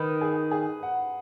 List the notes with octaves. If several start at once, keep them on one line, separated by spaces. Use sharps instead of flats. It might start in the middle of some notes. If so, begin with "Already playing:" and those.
Already playing: D#3 B4
G#4
G#4
F#5